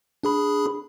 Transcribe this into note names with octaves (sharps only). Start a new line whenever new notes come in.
D4 G#4 B5